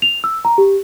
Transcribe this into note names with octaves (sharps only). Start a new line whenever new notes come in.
F7
E6
A#5
G4